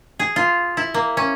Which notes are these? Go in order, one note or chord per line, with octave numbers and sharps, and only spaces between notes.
G#4
F4
E4
A#3
C#4